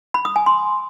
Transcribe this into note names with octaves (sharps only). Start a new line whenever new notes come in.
B5
D#6
G#5
C6